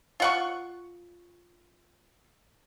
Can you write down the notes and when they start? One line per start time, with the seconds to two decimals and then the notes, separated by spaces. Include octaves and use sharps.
0.20 F4 F#5 C#6